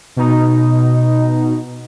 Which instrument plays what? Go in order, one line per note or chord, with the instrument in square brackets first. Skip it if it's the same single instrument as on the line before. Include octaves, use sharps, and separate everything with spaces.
[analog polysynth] B2 D#4